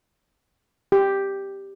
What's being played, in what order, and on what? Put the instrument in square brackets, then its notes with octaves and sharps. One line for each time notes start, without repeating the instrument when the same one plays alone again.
[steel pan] G4